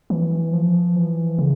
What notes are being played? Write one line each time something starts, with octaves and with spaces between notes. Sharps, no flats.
E3
F3
E3
C#3